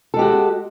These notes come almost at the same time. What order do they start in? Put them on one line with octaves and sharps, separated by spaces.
A4 G#3 G4 F#4